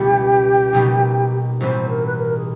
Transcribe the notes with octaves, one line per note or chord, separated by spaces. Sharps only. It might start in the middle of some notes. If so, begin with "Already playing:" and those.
Already playing: C#2 B2 G3 B3 E4 G4
B1 B2 G3 A#3 D#4
B1 A2 E3 G3 C4 C5
A#4
B4
A#4
G#4